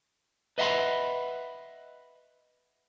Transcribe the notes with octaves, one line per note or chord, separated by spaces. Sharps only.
B4 D#5 E5 F#5 B5 C6